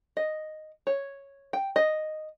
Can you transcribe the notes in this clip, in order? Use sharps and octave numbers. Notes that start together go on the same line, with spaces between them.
D#5
C#5
G5
D#5